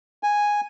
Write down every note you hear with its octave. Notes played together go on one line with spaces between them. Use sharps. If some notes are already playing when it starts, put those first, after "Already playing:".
G#5